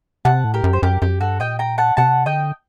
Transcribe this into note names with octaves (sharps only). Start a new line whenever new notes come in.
C3 F#5 A5
A2
G4 A#4
F#2
C5
F#2 G4 A#4
F#2 G4
G2 F#4 A4
A#2 D#5 G5
G5 A#5
F#5 A5
C3 F#5 A5
D3 D#5 G5